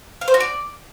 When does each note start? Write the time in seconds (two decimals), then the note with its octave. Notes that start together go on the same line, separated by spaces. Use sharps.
0.21 F5
0.28 C5
0.34 F#4
0.40 D5